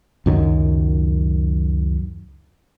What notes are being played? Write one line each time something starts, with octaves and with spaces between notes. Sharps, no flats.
C#2 F#2 D#3 F#3